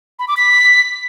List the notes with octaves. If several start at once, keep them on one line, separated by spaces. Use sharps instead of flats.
B5
D6
B6